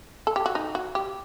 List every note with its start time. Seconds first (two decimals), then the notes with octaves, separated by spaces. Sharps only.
0.27 A4
0.36 G4
0.46 F#4
0.55 D#4
0.75 F#4
0.95 G4